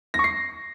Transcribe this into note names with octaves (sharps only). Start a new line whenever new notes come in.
A#6
C#6
C7